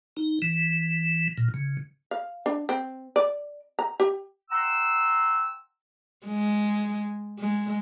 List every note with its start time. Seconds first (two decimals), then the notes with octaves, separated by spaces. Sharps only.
0.17 D#4
0.42 E3
1.38 A#2
1.54 C#3
2.11 F5
2.46 D4
2.69 C4
3.16 D5
3.79 A#5
4.00 G4
4.50 F#5 G5 A#5 C6 E6
6.26 G#3
7.39 G#3